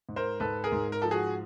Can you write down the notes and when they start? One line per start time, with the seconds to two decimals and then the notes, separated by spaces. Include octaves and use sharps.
0.09 G#2
0.16 A#4 C5
0.40 G#2 A4 B4
0.64 G#4 A#4
0.72 G#2
0.92 A#4
1.02 F3 A4
1.11 F#4 G#4